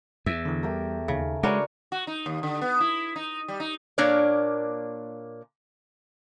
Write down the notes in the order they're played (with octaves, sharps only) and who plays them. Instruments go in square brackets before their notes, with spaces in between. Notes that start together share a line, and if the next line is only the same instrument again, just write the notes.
[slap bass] E2 [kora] E5
[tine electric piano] D3 E3
[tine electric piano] G3 [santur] A3 G4 A#4
[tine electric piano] D#2 D#4 [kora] C#3
[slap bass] G#3 [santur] D4 A#4 B4 [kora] F#4 C#5 [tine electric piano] D6
[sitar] F#4
D#4
D#2
D3
B3
E4
D#4
G3
D#4
[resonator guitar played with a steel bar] A#2 A#3 D4 A#4 C#5 D5